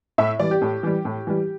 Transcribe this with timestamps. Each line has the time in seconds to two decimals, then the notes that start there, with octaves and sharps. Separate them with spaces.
0.18 A2 E5
0.39 E3 G3 D5
0.51 G4
0.62 A2
0.83 E3 G3
1.05 A2
1.27 E3 G3